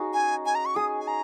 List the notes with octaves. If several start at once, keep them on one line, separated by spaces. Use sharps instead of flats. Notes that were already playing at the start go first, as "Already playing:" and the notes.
Already playing: C#4 D#4 F#4 G#4
G#5
G#5
A#5
C#6
G#4 D#6
G#5
A#5